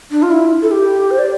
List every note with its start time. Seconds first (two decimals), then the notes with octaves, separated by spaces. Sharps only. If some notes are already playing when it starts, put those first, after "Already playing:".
0.11 D4
0.22 F4
0.31 E4
0.62 A4
0.71 G4
1.11 C5
1.19 D5